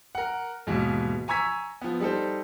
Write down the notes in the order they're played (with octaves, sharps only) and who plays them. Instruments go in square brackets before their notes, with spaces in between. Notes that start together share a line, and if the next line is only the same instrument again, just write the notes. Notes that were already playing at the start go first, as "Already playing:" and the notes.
[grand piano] A#4 F#5
D#2 G#2 B2 E3
G#5 A#5 C#6 E6 G#6 B6
F3 B3
G3 D#4 A4 C5